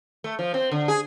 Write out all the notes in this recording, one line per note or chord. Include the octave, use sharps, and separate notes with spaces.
A3
F3
C4
D3
G#4